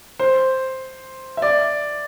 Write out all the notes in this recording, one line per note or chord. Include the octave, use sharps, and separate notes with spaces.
C5
E5
D5